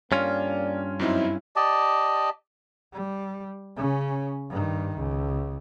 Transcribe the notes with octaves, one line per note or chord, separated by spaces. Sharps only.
G2 A#3 C#4 F4 C#5 D5
F#2 C4 D#4 E4
G4 D5 D#5 A5
G3
C#3 C#4
G2 D#3
C#2